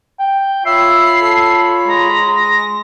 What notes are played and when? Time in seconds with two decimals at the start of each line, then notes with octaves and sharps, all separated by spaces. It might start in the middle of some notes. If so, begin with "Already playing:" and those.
0.19 G5
0.65 F4 C#5 E5 B5 C7
1.21 A4
1.88 G#3 A#5
2.35 A#6